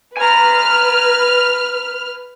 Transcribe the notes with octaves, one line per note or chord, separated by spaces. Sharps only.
B4 G#5 A#5 F6